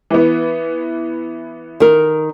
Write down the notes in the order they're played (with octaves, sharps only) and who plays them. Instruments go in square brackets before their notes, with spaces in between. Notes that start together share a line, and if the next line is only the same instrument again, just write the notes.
[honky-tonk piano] E3 B3
[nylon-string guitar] D#3 A#4